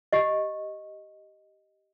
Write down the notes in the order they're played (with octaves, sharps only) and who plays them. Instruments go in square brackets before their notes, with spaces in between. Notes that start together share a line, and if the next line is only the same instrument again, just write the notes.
[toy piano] G4 D#5